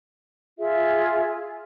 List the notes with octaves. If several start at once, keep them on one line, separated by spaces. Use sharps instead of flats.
F4 G#4 E5